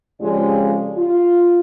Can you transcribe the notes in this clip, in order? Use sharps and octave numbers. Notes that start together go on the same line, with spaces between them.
F2 C#3 G#3 F4 G4 D5
F4